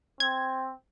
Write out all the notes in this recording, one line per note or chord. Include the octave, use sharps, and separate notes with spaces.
C4 G#6